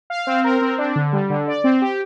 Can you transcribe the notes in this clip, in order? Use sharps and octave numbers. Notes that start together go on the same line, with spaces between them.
F5
C4
A#4
C4
D4
D3
G3
D3
D5
C4
G4